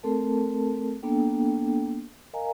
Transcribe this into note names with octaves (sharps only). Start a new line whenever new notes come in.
A3 C4 A4 A#4 A5
A#3 B3 D4 A4 G5
A#4 D#5 F5 G#5 A#5